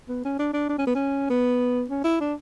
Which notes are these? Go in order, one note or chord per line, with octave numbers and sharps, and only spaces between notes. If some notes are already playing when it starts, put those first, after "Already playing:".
B3
C#4
D4
D4
D4
C#4
B3
C#4
B3
C#4
E4
D4